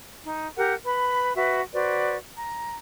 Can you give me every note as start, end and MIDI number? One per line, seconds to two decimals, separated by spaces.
0.25 0.46 63
0.57 0.74 67
0.57 0.74 70
0.57 0.74 78
0.85 1.35 71
0.85 1.35 83
1.36 1.61 66
1.36 1.61 71
1.36 1.61 76
1.73 2.16 66
1.73 2.16 71
1.73 2.16 72
1.73 2.16 74
2.37 2.76 82